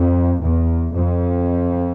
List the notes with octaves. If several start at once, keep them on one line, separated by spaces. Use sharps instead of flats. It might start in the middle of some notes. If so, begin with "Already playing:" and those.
Already playing: F2
E2
F2